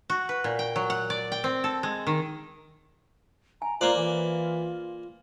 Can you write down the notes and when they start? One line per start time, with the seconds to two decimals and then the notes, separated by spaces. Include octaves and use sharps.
0.10 F#4
0.29 B4
0.44 A#2
0.59 G5
0.76 F#3
0.90 F#5
1.10 D5
1.32 G5
1.44 C4
1.64 A4
1.83 G#3
2.07 D#3
3.62 G#5 A#5
3.81 A#3 F4 C5 D5 A#5
3.97 E3 F4